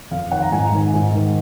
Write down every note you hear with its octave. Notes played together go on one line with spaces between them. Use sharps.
F2 F5
D#3 F#5
A#5
G#2 G#5
D#3
G#2
D#3